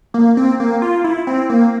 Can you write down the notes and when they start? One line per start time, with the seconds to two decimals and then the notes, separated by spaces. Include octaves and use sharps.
0.14 A#3
0.37 C4
0.60 A#3
0.82 F4
1.04 E4
1.27 C4
1.50 A#3